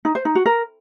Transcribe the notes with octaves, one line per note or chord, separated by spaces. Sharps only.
D#4
C5
D#4
F#4
A#4